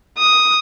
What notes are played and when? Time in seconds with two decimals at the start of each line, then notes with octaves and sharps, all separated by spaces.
0.18 D#6